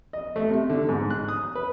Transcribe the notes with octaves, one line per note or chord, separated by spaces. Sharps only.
D#5
A3
C3
D3
G#2
F#6
D#6
B4